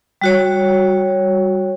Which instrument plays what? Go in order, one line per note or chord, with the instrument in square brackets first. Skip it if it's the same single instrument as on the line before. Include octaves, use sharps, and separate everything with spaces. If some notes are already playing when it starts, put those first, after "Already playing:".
[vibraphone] G3 F#4 C#5